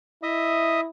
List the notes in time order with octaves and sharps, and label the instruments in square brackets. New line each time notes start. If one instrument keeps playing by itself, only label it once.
[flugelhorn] E4 [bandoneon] D#5 E5 D#6